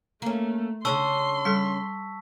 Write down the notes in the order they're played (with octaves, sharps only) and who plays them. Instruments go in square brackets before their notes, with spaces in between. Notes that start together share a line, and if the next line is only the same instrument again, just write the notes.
[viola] A3 [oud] A#3 C#4
[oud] C#3 C#4 D4 [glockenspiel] A5 C#6 E6 [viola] C6
[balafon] G3 A4 [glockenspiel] B6